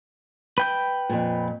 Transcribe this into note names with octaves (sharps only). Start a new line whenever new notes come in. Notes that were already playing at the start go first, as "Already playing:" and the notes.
B4 G5 G6
F2 A#2